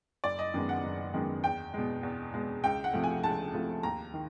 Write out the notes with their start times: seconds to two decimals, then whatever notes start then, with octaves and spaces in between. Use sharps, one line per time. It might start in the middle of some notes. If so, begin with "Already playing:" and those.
0.24 F#1 D5
0.39 D#5
0.54 F#2 D#3 G#3 B3
0.69 F#5
0.84 F#1
1.13 F#2 D#3 G#3 B3
1.44 E2 G5
1.74 B2 G#3
2.03 E2
2.33 B2 G#3
2.63 C#2 G5
2.84 F#5
2.93 C3 F3 A3
3.04 G#5
3.24 C#2 A5
3.53 C3 F3 A3
3.83 D#2 A#5
4.14 D#3